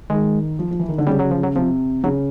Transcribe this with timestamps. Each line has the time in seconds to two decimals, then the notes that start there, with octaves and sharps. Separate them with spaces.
0.10 D#3 G#3
0.59 F3
0.71 F3
0.79 E3
0.88 D#3
0.98 D3
1.07 C#3 G3
1.19 F#3
1.31 F3
1.43 F#3
1.56 C3 F3
2.04 C#3 F#3